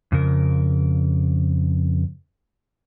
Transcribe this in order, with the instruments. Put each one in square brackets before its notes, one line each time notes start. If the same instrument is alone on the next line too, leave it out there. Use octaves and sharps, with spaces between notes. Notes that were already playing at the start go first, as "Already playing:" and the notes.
[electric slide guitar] F2 C#3 A#4